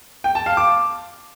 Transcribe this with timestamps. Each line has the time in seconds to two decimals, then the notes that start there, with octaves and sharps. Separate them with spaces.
0.24 G5
0.35 A5
0.46 F5
0.57 D6